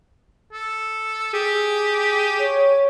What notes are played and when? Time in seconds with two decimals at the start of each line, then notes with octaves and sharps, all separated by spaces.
0.53 A4
1.34 G4 G#4
2.39 C#5